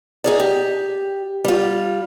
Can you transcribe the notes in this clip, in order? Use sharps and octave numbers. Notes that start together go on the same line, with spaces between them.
D#4 G#4 D5
G4
G3 F4